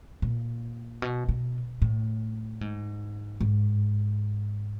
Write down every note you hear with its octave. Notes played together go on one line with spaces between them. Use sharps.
A#2
B2
B2
A2
G#2
G#2